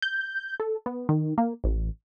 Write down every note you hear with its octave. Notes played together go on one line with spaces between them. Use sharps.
G6
A4
B3
D#3
A#3
A1